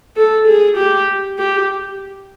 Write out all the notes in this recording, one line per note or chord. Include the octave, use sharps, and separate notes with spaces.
A4
G#4
G4
G4